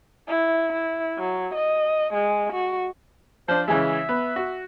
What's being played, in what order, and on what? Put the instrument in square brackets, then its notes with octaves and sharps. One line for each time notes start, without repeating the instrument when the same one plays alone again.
[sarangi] E4
E4
F#3
D#5
G#3
F#4
[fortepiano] F3 D4 [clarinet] C5
[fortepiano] C#3 E3 G#3 [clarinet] E5
[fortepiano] B3
F#4